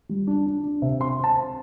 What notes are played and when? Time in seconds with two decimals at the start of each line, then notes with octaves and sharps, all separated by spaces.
0.09 G3
0.27 D4
0.46 D4
0.63 D4
0.82 C3
1.00 C4 C6
1.19 C4
1.24 A5
1.36 C4